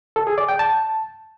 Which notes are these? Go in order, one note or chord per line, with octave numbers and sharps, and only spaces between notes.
A4
G#4
D5
G5
A5